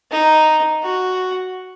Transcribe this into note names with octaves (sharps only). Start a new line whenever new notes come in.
D#4
F#4